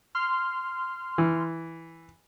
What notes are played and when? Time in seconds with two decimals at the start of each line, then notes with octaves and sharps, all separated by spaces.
0.15 C6 F6
1.18 E3